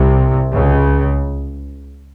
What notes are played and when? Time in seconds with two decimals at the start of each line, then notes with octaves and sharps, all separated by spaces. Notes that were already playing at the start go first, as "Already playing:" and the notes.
Already playing: C2 C3
0.54 C#2 C#3